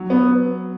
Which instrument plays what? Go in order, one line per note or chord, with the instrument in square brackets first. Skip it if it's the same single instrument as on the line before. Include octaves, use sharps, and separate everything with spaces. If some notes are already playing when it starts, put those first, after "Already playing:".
Already playing: [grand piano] F#3
[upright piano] B3